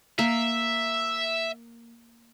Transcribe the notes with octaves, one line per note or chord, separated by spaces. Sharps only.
A#3 E5